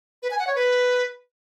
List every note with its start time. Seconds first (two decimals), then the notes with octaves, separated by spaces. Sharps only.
0.23 B4
0.31 G#5
0.39 F#5
0.47 C#5
0.55 B4